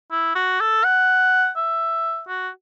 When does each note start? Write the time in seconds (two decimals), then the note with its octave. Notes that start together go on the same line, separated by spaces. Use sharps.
0.11 E4
0.35 F#4
0.60 A4
0.84 F#5
1.57 E5
2.28 F#4